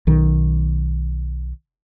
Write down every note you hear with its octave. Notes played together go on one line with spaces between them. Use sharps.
B1 D#3